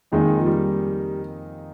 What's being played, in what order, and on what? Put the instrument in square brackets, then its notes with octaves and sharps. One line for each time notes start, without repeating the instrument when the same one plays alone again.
[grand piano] F2 D#3 A#3 D#4 G#4 [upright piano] G#3
[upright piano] F3
G3